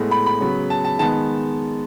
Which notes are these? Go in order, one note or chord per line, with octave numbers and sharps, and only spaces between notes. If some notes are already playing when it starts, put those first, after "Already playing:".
Already playing: A2 G#3 B3
B5
B5
C#3 F#3 B3
A5
A5
D#3 G#3 B3 A5